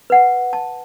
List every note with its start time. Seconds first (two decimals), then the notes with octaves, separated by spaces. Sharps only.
0.10 B4 F#5
0.53 A5